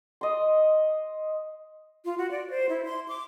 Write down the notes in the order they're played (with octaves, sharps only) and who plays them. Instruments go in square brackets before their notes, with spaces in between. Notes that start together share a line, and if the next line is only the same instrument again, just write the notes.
[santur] D#5 C6
[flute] F4
F#4
D5
C5
E4
C6
D6